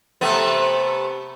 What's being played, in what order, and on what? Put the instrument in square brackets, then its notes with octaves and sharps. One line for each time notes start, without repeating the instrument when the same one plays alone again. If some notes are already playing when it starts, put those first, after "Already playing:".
[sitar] C3 A3 B3